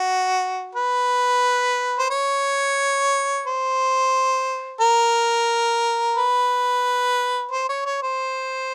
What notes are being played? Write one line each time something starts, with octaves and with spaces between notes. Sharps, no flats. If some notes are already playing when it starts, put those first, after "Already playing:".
Already playing: F#4
B4
C5
C#5
C5
A#4
B4
C5
C#5
C#5
C5